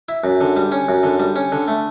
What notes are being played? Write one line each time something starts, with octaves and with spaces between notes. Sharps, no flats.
E4
F#2
D3
G3
C#4
F#2
D3
G3
C#4
D3
A3